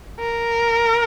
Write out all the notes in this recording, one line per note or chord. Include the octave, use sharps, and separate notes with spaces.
A#4